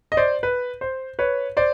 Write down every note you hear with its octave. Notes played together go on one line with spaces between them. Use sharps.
D#5
C5 D5
B4
C5
B4 C#5
C5 D5